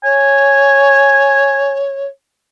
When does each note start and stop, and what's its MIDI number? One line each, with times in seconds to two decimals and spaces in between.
0.04 2.06 73
0.04 1.78 80